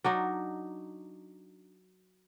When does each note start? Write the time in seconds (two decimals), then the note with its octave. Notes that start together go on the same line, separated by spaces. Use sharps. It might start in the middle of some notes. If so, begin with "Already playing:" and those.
0.04 F#3 D4 D#4